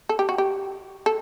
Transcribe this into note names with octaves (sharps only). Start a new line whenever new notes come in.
A4
G4
F#4
G4
A4